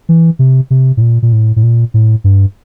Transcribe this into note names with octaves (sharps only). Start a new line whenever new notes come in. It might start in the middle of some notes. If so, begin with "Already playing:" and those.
E3
C3
C3
A2
A#2
A#2
A2
A2
A#2
A2
G2